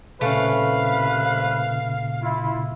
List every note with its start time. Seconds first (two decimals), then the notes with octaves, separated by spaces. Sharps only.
0.21 C2 A#2 C#3 A3 C#4 B4 F5
2.22 E4 F4